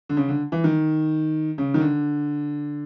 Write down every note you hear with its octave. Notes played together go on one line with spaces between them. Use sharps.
D3
C#3
D3
E3
D#3
C#3
D#3
D3